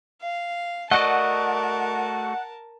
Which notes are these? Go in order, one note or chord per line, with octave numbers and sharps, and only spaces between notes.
F5
A3 F#4 A#4 D5 D#5 F#5 A5